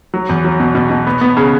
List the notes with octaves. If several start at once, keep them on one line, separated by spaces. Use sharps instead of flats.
F#3
E2
F#3
B2
B2
B2
B3
B3
C#3